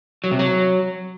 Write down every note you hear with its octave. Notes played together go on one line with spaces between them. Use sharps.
F#3
C3
F#3